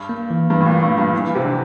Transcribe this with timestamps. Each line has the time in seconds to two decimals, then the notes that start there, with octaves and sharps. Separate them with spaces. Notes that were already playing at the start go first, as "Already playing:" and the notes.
Already playing: G2
0.09 A#3
0.30 E3
0.50 G2 E3
0.61 A2
0.66 A#2 A#3
0.83 A2
0.93 G3
0.98 G2
1.13 E3 F3
1.34 C3 C4
1.44 D3